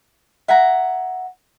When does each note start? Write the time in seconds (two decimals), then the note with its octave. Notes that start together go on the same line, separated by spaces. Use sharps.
0.48 E5 F#5 G#5 A#5